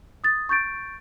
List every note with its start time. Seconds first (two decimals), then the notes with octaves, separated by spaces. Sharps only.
0.24 D#6 A6
0.49 C#6 G6 A6 D7